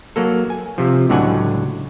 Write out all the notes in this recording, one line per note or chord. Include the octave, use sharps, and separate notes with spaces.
F#3 A#3 A4
G#5
C3 F3
C#2 A2 D3 F#3 F#5 G#5